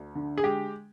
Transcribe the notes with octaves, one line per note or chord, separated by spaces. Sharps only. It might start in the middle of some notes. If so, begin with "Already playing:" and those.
Already playing: D2
D3
G#4
G#3 G4